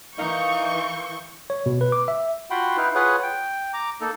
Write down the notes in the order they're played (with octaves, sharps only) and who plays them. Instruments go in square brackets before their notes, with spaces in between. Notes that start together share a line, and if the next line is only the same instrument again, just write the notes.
[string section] E3 G6 [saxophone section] D#4 [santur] A#4 D#5 F5 [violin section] C#6
[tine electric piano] C#5
B2
B4
D6
E5
[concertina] F4 F#4 F#5 G5 B5 C6
D#4 E4 B4 F5
F4 G#4 B4 C#5 F#5
G5
A#5 D6
A#3 D#4 A4